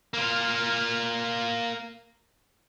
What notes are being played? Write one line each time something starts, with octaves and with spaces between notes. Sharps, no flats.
A#3 F4